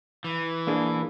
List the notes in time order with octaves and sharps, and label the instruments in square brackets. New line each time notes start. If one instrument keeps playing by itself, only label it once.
[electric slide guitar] E3
[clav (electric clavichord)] A#3 D4 G#4